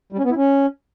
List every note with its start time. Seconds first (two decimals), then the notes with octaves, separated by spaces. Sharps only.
0.12 G3
0.18 C#4
0.25 B3
0.31 E4
0.37 C#4